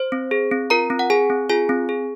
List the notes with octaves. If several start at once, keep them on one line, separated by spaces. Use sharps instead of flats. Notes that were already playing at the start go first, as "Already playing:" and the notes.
Already playing: C5
C4
G#4
C4
F4 A#4 A#5
C4
F#5
G#4 G#5
C4
F4 G#4 G#5
C4
G#4